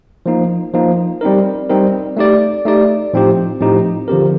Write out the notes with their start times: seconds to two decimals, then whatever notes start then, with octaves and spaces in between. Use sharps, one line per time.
0.26 F3 A#3 D#4
0.74 F3 A#3 D#4
1.21 G3 C4 D#4 A#4
1.69 G3 C4 D#4 A#4
2.17 A3 D#4 G4 D5
2.65 A3 D#4 G4 D5
3.13 A2 F3 C4 D#4 G4
3.60 A2 F3 C4 D#4 G4
4.08 D3 F3 C4 G4 A#4